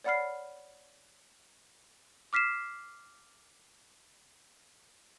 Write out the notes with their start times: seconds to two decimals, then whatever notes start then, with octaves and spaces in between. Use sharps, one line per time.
0.04 C#5 D5 F#5 B5 F6 C7
2.33 D6 F6 B6 C7 E7